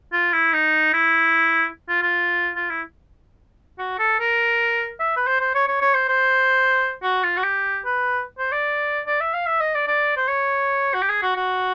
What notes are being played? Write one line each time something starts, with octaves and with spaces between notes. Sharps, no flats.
F4
E4
D#4
E4
F4
F4
F4
E4
F#4
A4
A#4
E5
B4
C5
C5
C#5
C#5
C#5
C5
C5
F#4
F4
F#4
G4
B4
C5
D5
D5
E5
F5
E5
D#5
D5
D5
C5
C#5
F#4
G4
G#4
F#4
F#4